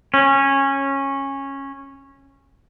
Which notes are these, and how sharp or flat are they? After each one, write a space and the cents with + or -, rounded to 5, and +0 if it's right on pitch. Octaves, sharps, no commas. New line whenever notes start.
C#4 -15